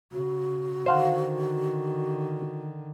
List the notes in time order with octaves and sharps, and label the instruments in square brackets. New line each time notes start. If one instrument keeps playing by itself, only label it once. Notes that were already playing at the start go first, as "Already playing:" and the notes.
[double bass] C#3 [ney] F#4
[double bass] D3 D#3 [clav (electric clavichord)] C5 F5 F#5